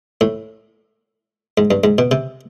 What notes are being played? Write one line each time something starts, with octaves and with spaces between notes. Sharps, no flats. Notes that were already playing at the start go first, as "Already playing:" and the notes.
A2
G#2
G2
G#2
B2
C3